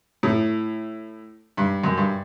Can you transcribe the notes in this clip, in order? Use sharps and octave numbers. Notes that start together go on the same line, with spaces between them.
A2
G2
F#2
G2